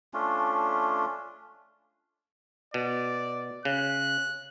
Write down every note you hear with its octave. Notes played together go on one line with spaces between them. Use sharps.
A3 C#4 D4 F4
B2 D5
C#3 F#6